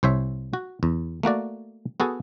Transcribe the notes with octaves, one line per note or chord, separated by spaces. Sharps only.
C2 C5 C#5 E5
F#4
E2
A3 A#3 F#4 D5
B3 F#4 G#4 A4